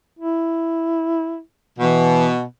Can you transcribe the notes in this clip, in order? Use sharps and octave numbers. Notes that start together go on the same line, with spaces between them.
E4
B2 E3